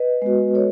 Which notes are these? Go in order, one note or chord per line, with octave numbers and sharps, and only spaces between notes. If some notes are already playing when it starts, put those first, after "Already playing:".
Already playing: B4 D#5
G#3 B3 F#4
G#3 A4 C#5